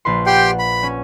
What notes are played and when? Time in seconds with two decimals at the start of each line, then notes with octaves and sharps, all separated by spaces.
0.05 A#1 B4 C6
0.26 G4 F#5 G5 C6
0.59 B5
0.83 C#4